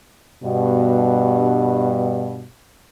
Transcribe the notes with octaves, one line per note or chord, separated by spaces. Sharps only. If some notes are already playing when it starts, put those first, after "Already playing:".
G2 B2